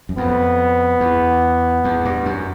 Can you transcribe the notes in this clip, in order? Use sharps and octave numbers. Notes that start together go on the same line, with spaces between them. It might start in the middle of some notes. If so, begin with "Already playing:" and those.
F#2
F2 B3
E2
E2
G2
F#2